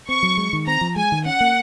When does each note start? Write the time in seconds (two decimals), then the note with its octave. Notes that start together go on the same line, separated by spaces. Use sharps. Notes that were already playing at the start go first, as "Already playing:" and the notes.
0.08 C4 C#6
0.23 F#3
0.37 G#3
0.53 D#3
0.67 C4 A#5
0.81 F3
0.96 G#3 G#5
1.12 D#3
1.26 C#4 F#5
1.41 A#3